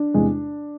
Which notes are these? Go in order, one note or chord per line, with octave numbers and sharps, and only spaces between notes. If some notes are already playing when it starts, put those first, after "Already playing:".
Already playing: D4
E2 C3 G#3